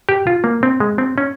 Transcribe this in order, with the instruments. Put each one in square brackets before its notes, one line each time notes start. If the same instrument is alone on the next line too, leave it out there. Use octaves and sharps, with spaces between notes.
[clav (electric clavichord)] G4
F4
A#3
C4
G#3
C4
C#4